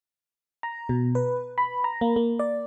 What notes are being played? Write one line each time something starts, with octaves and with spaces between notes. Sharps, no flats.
A#5
B2
B4
B5
A#5
A#3
A#3
D5